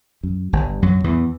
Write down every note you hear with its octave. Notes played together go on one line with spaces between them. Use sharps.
F#2
G1 G2
F#2 F#3
E2 E3